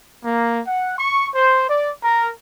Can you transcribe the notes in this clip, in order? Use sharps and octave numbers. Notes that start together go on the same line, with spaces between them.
A#3
F#5
C#6
C5
D5
A#4